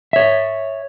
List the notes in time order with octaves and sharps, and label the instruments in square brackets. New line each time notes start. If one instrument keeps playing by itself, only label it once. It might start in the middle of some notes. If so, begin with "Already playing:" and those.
[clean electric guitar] C#5 E5